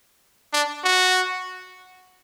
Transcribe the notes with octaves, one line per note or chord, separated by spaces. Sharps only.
D4
F#4